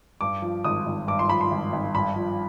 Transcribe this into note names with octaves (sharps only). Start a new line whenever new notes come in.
G2 D6
F3
G#1 D#6
G#1
G2 D6
C6
F3 B5
C6
G#1
G#1
G2 B5
F3